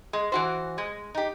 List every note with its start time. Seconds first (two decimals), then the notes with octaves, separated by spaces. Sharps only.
0.13 G#3
0.32 E3 F#4 C5
0.78 G#3
1.15 D#4 G4